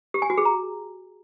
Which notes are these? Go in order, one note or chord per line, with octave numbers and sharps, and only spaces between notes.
G4
G#5
F#4
G#4
A#5